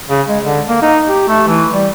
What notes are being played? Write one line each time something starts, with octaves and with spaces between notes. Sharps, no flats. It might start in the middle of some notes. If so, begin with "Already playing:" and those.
C#3
G#3
D3
A#3
D#4
G4
A3
E3
G3